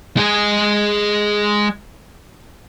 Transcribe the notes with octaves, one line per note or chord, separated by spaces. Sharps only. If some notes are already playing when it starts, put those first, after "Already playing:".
G#3 G#4